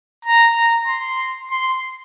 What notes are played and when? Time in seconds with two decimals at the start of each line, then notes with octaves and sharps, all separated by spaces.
0.25 A#5
0.56 A#5
0.87 C6
1.50 C6